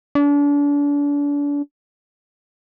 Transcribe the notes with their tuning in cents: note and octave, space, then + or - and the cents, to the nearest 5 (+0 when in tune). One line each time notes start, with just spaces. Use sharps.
D4 -35